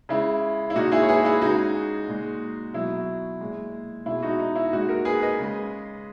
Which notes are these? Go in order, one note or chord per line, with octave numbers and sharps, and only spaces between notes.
C#3 G#3 E4
E4
A#2 G#3 D#4 F#4
E4 G#4
C#5
G#4 B4
E4 G#4
C#3 G#3 D#4 F#4
A#2 G#3
B2 F#3 E4
A#2 G#3
B2 G#3 E4
D#4 F#4
D#4
E4
A#2 G#3 D#4 F#4
F#4 A#4
G#4 B4
B4 D#5
C#3 G#3